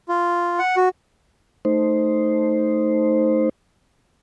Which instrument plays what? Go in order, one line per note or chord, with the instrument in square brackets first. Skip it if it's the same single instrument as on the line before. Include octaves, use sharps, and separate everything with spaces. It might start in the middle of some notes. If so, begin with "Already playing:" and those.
[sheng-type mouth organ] F4
F#5
F#4
[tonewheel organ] A3 D#4 C5